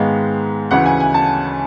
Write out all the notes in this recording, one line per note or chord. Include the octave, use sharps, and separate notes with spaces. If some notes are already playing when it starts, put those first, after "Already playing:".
Already playing: G#2 D#3 G#3 B3 F5
D2 C#3 E3 F#5
G#5
G#5
A5